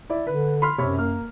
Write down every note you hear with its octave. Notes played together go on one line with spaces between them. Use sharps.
E4 D5
D3 B4
B5 C6 F6
F#2 C3 C#5 B5
A#3 F6